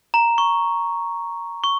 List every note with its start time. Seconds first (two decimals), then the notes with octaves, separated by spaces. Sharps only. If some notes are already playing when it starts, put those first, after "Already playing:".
0.14 A#5
0.38 C#6
1.64 C#6